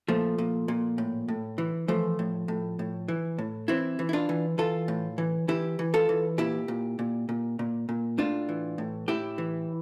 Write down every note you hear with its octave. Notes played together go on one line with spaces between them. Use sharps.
A#2 F3 A3
A#2
A#2
A2
A2
E3
E3 F3 A3
A2
A2
A2
E3
A2
E3 C4 E4
E3
E4
D4 F4
E3
E3 F4 A4
A2
E3
E3 E4 G4
E3
F4 A4
E3
A#2 E4 G4
A#2
A#2
A#2
A#2
A#2
A2 D4 F4
E3
A2
A2 E4 G4
E3